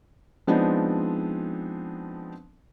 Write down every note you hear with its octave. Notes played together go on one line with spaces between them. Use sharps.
F3 G#3 B3 C4 D4 D#4